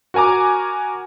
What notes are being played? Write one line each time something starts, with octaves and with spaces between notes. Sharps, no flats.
F#4 A#4 G#5 A#5 D6